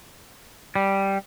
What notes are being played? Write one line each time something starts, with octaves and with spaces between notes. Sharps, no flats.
G3